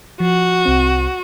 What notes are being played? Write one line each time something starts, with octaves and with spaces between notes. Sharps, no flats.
F3 F#4
C2 C4